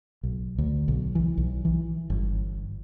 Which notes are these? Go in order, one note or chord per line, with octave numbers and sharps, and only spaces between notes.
B1
D2
B1
E3
B1
E3
G1